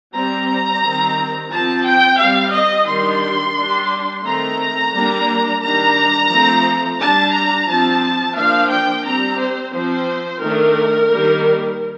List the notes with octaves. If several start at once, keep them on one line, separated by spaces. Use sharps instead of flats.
G3 C4 A#5
D#3 G3 C4
F3 C4 A5
G5
G3 C4 F5
D#5
D#3 G3 D4 C6
G3 D4
D#3 A3 C4 A#5
G3 A#3 D4
D#3 G3 D4 A#5
F3 A3 C4
G3 D4 A5
A#5
F3 C4 A5
F3 A#3 D4 F5
G5
G3 C4 A#5
C5
F3 C4 C5
D#3 A3 D4 A#4
D#3 G3 A#3